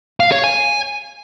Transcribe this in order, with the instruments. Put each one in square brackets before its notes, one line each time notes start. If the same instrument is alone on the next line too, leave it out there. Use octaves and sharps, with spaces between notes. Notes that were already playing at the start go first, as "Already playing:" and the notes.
[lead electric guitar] F5
C#5
G#5